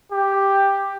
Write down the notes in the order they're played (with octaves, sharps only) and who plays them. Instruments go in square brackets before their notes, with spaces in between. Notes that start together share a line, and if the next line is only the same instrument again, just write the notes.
[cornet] G4